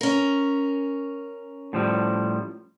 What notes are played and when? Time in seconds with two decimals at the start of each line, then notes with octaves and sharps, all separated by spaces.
0.01 C#4 A#4
1.73 A2 F3 G3